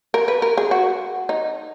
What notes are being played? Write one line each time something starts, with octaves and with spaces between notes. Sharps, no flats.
A#4
B4
A#4
G#4
F#4
D#4